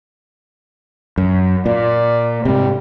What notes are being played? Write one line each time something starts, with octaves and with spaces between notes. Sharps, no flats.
F#2
A#2 D5
G#2 C3 G3